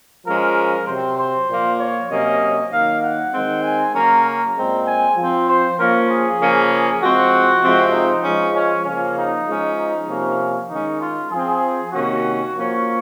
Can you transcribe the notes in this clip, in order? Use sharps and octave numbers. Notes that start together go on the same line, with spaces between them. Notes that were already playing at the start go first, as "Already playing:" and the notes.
F3 G#3 C#4 A#4
C3 F#3 C4 C5
C5
A#2 F3 A#3
C#5
C3 F#3 A#3 C#4 D#5
D#3 F#3 A#3 F5
F#5
D#3 G#3 C4
G#5
C#3 F#3 A#3 C#4 A#5
A#5
A#2 G#3 C4
G#5
F3 C4
C5
F3 A#3 C#4 A#4
G#4
C#3 F3 A#3 C#4
G#4
F3 G#3 C4 F#4
C3 F3 G#3 C4
D#4
F3 G#3 C#4
C#4
C#3 F3 A#3 C#4
D#4
F3 G#3 C#4
D#4
C3 F3 A#3 C#4
D#3 G#3 C#4 D#4
F4
F3 C4 G#4
C3 D#3 A#3 C#4 F#4
F3 A#3 C#4